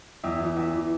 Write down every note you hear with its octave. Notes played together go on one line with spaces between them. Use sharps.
E2 E5
E3
E2 E5
E3